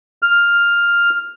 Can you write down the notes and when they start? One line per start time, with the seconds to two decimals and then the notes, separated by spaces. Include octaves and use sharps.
0.22 F6